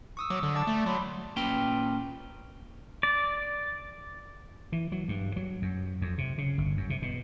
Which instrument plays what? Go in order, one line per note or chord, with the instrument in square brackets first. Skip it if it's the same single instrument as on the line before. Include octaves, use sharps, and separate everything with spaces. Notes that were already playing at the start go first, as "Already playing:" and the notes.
[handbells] C#6 D#6 E6
[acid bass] F#3 [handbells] C#6 D6
[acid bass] D3
[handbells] D5 A5 D6
[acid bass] A3 [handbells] D6
[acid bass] F#3 [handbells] B5 C6
[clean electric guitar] A#2 C#4 B4 G5
[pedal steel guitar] D5
[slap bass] E3
F#3
G2
F#3
F#2
F2
C3
C#3
G1
F#2
C3
B2